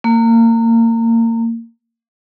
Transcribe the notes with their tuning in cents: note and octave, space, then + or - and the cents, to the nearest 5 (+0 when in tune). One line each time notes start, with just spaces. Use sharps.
A#3 -30